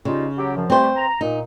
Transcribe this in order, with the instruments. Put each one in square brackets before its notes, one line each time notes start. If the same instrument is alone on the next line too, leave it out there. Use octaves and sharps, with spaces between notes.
[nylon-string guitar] C#3 [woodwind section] G3 D#4 F4
[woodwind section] F#3 G4
F#2 F3
[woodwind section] G3 A3 [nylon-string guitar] C4 C5
[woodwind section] A#5
[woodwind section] A#2 [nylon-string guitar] D#4